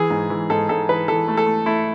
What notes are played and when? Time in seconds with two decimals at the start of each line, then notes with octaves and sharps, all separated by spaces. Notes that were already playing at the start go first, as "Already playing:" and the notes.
Already playing: E3 G#4
0.10 G#2
0.30 E3
0.50 G#2 A4
0.69 G#2 A4
0.88 E3 B4
1.08 E3 A4
1.28 A3
1.37 A4
1.46 A3
1.66 A3 E4